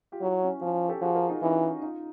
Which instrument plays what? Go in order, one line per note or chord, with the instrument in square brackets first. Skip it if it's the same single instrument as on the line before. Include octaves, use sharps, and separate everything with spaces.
[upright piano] F4 G4
[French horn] F#3 [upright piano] E4 F#4
[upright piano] C#4
[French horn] F3 [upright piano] C#4
[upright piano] G4 A4
[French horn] F3 [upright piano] F#4 G#4
[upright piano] G#4 A#4
D#4 F4
[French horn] E3 [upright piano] C#4 D#4
[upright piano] D#4 F4